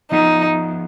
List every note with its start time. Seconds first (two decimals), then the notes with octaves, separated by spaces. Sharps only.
0.11 F3 B3 D#4 F4 G#4 B4